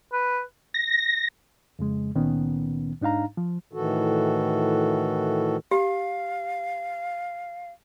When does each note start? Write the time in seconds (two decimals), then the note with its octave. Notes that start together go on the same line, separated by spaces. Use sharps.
0.13 B4
0.74 A#6
1.79 F2 C#3 G#3
2.15 C#2 A#2 D#3 B3 C#4
3.01 G#2 D4 D#4 F5 A#5
3.37 F3
3.73 A2 D#3 E3 F#4 A4
5.71 G4 F5